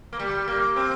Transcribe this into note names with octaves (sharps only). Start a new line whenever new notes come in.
A#3
G3
A#3
C4